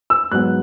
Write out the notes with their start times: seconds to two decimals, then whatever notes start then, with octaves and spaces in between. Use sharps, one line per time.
0.10 E6
0.31 G#2 F#3 B3 F#6